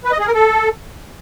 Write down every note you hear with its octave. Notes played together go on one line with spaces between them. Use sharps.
B4
D#5
G#4
A#4
A4